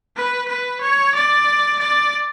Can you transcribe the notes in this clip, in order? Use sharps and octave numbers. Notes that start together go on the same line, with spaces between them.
B4
B4
C#5
D5
D5